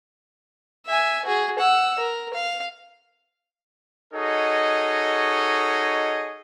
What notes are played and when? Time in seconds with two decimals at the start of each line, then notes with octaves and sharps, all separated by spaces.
0.87 E5 G#5
1.25 F#4 G#4
1.59 F#5 E6
1.99 A#4
2.34 F5
4.13 D#4 F#4 G#4 A4 C#5 D#5